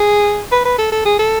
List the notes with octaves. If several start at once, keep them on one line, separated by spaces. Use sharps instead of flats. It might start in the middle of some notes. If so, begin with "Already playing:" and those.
Already playing: G#4
B4
B4
A4
A4
G#4
A4